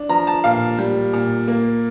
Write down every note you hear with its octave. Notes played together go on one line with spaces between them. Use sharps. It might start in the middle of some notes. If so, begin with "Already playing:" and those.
Already playing: D4
F3 A#5
A5
A#2 F5
G3
A#2
A#3